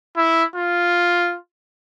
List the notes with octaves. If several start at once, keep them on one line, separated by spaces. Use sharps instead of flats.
E4
F4